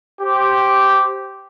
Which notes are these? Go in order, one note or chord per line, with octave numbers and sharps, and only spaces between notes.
G4 C5